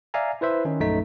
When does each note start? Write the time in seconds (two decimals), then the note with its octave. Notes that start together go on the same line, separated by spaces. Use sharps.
0.14 D5 E5 F5 G#5 A#5
0.41 E4 B4 C5 E5
0.65 D#3 C#4 D#4
0.80 A#1 F#2 A3 D#4 B6